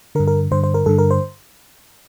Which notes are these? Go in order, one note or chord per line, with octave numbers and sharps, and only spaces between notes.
G2 D3 A#4
A#4
G2 D3 C5
C5
A#4
G2 D3 A4
A#4
C5